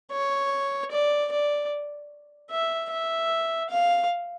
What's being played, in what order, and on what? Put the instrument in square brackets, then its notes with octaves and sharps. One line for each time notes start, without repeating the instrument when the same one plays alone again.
[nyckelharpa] C#5
D5
D5
E5
E5
F5